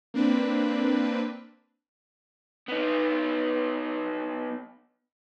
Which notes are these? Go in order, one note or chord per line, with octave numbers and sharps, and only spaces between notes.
A#3 C4 D4 B4
B3 D#4